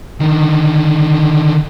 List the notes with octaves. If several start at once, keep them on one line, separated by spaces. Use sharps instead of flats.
D3 D#3